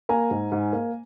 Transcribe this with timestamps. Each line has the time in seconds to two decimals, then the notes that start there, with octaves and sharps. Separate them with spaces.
0.09 A#3 G#5 A#5
0.31 G#2
0.52 G#2
0.73 A#3